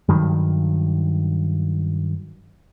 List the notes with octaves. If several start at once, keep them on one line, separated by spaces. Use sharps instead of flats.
G2 D#3 F#3